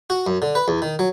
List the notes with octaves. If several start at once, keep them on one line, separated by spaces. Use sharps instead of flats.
F#4
F#2
D3
B4
E2
D#3
F#3